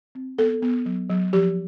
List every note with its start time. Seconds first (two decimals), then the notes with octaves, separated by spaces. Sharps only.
0.15 C4
0.38 B3 A4
0.62 B3
0.86 F#3
1.09 F#3
1.33 F3 G4